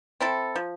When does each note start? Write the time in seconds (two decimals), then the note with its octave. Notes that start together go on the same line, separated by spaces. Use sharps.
0.20 C4 E4 A4
0.56 F3